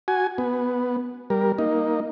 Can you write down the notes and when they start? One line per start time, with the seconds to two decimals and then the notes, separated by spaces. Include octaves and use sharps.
0.08 F#4 G#5
0.38 B3
1.30 G3 A#4
1.58 A#3 D#4